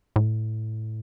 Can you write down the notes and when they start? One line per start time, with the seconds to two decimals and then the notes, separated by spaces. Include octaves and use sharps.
0.16 A2